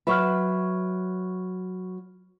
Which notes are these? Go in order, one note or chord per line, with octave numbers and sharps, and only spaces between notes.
F#3 B4 E5 B5 C#6 F6